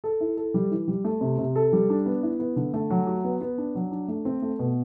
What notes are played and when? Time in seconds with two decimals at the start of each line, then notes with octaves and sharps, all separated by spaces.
0.04 A4
0.21 E4
0.37 A4
0.54 G3
0.71 E3
0.88 G3
1.04 A3
1.21 C3
1.38 C3
1.56 A4
1.73 G3
1.90 D4
2.06 B3
2.23 E4
2.39 B3
2.56 D3
2.74 A3
2.90 F#3
3.07 F#4
3.24 B3
3.41 B3
3.58 D4
3.75 F#3
3.91 D4
4.08 A3
4.25 C4
4.42 A3
4.59 B2